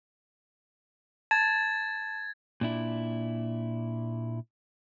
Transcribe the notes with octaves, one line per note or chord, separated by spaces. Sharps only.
A5 G#6 A6
A#2 D4 E4